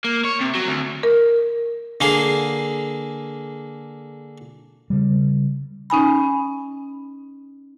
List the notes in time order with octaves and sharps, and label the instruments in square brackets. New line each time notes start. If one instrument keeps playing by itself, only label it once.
[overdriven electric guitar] A#3
C#5
C3
F#3
D2
[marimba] A#4
[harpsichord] D3 A#3 G#4 C6
[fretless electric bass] C#3 G3
[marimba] C#4 D#4 G#5 B5